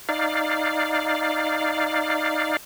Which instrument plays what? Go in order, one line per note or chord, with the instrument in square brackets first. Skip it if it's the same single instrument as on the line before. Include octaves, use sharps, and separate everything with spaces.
[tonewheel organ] D#4 D5 F5